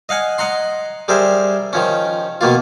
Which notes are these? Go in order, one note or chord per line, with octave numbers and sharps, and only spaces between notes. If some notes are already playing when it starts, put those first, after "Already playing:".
D#5 F5 F#5 G#5
D#5 F#5 A#5 C6
G3 G#4 A#4 C5 E5
D#3 F3 C#4
B2 D#3 A#3 F4